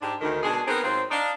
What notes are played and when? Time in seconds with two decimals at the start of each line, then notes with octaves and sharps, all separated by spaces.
0.01 G#2 D4 G4
0.21 D2 D#3
0.43 B2 G#3 D4 G#4
0.67 B3 C4 D#4 G#4 A#4 C5
0.84 G#2 F#3 C4 F4 C5
1.11 D4 D#4 F5